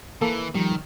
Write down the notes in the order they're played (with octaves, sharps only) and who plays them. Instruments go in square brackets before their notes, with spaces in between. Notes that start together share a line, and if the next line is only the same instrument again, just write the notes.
[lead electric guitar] E3 [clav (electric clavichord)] A#3 A4
[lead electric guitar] D#3 [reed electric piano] F3 G3